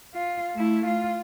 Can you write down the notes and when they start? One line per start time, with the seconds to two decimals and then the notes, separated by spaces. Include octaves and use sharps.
0.15 F4
0.55 A3 E4
0.86 F4